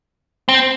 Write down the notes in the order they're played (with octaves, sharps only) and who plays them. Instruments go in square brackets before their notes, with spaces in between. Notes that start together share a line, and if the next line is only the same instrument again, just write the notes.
[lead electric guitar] C4